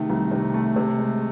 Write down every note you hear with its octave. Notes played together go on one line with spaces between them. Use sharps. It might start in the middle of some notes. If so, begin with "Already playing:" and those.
Already playing: C3 D#3 A3
C2
C3
A3
C3
G#3